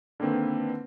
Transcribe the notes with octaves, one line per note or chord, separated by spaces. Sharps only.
D3 D#3 A#3 C4 B4